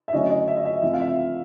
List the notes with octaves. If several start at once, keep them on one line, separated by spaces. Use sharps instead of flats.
E5
D3 F#3 A3 C#4 E4 D#5
D#5
E5
D#5
E5
F3 A3 C4 E4 E5
F5
E5